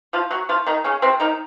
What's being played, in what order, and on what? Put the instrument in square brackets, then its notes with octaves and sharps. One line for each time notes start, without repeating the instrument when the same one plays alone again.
[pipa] F3 F4
F#3 F#4
F3 F4
D#3 D#4
C#3 C#4
C3 C4
D#3 D#4